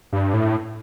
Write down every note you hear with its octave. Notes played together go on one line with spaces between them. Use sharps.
G2
A2